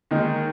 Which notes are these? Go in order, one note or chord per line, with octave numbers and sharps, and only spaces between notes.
D#2 D#3 G#3 D#4 A#4